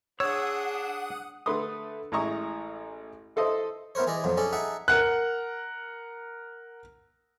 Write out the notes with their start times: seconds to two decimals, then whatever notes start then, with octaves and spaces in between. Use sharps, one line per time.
0.20 D4 G#4 C#5 F#5 D#6 E6
1.46 D3 A3 B4 C6 D#6
2.12 A1 G#3 E4 A#5 C#6 D#6
3.36 E4 A4 C5 D#5 E5
3.95 B3 E4 A#4 C5 C#5
4.07 E3 G#4 D5 D#5
4.24 F2 B2 F3 F#3
4.37 C#4 G#4 A4 D5
4.53 D#4 G#4 E5 F#5 A5
4.88 A#4 F#5 F#6